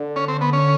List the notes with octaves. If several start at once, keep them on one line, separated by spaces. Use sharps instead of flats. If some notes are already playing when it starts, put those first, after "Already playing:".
Already playing: D3
C#4
C4
B3
C#4